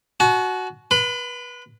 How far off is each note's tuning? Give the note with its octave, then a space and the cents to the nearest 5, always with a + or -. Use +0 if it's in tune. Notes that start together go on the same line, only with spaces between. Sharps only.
F#4 +0 A5 -45
B4 -25 B5 +35